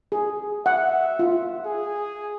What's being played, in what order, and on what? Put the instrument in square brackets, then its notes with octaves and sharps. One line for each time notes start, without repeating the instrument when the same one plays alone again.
[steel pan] G#4
[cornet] E5 [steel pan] F#5
[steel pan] F4
[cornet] G#4